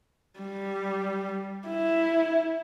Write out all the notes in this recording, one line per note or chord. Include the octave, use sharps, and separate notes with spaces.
G3
E4